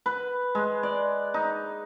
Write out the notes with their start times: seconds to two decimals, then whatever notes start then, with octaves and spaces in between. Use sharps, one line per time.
0.06 B4
0.55 G#3
0.83 D5
1.34 D#4